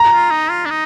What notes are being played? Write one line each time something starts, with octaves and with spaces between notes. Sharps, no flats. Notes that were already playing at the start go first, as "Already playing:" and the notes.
Already playing: A#5
F4
D#4
F4
D4
D#4